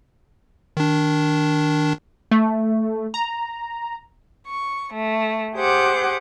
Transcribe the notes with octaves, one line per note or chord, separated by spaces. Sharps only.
D#3 D4
A3
A#5
C#6
A3
G4 G#4 C5 F#5 D6 G6